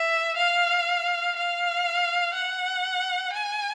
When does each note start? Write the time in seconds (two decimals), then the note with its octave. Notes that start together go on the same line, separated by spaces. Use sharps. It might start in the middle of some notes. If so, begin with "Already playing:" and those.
Already playing: E5
0.37 F5
1.36 F5
2.34 F#5
3.33 G#5